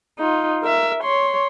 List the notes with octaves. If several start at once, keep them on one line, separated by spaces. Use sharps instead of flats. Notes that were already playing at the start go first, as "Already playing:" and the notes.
D#4 F4
A#4 E5
C#5 C6